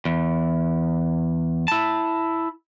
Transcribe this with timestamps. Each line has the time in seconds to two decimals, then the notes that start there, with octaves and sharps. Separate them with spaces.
0.05 E2
1.68 E4 A5